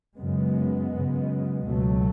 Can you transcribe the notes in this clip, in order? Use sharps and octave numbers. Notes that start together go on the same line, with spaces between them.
F#2 C#3 G#3 B3
F#2 C#3
C#2 B2 F#3 A3